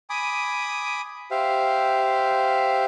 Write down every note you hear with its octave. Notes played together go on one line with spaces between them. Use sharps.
G#5 B5 D6 D#6
G4 C5 E5 F5